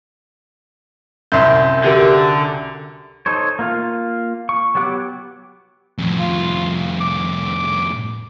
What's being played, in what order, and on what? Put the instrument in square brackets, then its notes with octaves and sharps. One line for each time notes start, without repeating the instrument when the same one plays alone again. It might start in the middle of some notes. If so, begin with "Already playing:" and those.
[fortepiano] C2 F#2 [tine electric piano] E5 C6 G6
[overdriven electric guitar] D3 [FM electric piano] F#4 G4 A#4
[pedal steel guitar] D#4 A4 C5 C#5
A#3 F4 F5
C#6
F#3 B3 G4 F#5 D6
[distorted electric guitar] F2 A2
[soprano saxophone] F4
D6